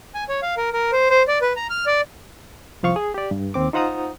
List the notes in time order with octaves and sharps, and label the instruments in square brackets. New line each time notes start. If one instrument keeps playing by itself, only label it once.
[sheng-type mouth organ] G#5
C#5
F5
A#4
A#4
C5
C5
D5
B4
A#5
F6
D5
[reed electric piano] C2 F3 F5 C#6
G#4
G4 D5
G2
D#2 C4 D6
D#4 F4 C5 F#5 A#5 D#6